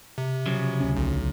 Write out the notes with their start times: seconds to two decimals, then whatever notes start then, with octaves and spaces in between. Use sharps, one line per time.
0.18 C3
0.46 C#3 F3 F#3
0.80 D2 C#4
0.97 B1